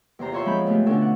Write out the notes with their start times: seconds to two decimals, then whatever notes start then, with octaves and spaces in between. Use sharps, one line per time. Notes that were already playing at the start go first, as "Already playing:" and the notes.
0.19 E2 C3 C5 A#5
0.32 F4 C5 C#5 E5 C6
0.45 F3 G#3 C4 B5 G6
0.66 C3 A3 B3 C4
0.86 B2 D3 B3 C#4 D4 A4
1.02 F#5